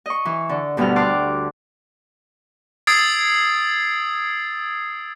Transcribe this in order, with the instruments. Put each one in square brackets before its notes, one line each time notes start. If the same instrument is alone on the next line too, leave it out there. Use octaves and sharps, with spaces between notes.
[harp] D#5 C#6
E3
D3
D2 B2 D3 G3 B3 F6
A5 C6 D6 F6 F#6
[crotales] D#6 E6 G#6 A6 C7 D7